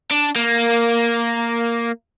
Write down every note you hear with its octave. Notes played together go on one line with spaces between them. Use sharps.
D4
A#3